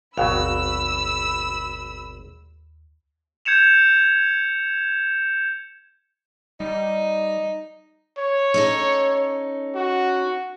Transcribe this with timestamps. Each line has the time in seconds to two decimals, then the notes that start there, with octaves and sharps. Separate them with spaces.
0.18 G#1 D#2 B2 F#3 F5 B5 E6
3.45 G6 G#6 C#7 E7 F7
6.60 G3 D#4
8.18 C#5
8.54 C#4 D#4 A4
9.75 F#4